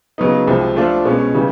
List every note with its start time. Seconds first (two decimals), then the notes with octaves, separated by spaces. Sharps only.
0.18 C#3 F#3 B3 D#4
0.48 C2 C3 F3 G#3
0.76 F3 A3 D4 F4
1.05 B2 G#3 C#4
1.34 C#3 E3 G3